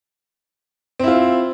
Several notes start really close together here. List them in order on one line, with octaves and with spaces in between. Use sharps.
C4 E4 F4